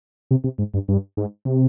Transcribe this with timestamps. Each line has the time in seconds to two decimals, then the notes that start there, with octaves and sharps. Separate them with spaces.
0.31 C3
0.44 C3
0.58 G#2
0.74 G2
0.88 G2
1.17 G#2
1.45 C3